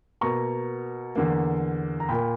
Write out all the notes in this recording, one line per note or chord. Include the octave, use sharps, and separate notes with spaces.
B2 A#3 A#5 C#6
E2 D3 A#3
A#5
A#2 A#3 G5 B5